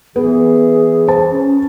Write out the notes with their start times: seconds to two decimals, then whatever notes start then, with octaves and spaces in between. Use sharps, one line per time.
0.16 E3 B3 G#4
1.08 C5 A5
1.31 C#4